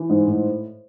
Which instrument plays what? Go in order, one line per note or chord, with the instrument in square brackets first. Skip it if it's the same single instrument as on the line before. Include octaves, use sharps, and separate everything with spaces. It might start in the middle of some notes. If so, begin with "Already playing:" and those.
Already playing: [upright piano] E3
G#2
A2